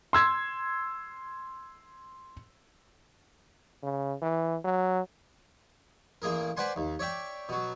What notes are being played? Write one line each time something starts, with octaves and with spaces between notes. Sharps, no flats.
C6 E6 G#6
C#3
E3
F#3
A1 A#3 G#4 A#4
B4 C5 D5 F#5 G#5 C6
D#2
C#5 D5 E5 G5
B2 F#3